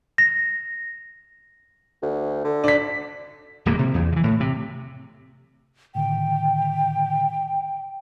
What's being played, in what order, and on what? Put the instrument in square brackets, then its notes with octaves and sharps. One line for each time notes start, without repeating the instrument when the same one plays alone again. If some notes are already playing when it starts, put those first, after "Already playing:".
[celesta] A#6
[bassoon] D2
D3
[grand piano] D4 B6
[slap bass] D1 F2 A#2 A#3
C3
E2
C#3 E3
A2
C3
[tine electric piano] A2 D3 D#3 [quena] G5